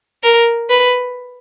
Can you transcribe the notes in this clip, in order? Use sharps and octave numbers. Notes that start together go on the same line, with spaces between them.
A#4
B4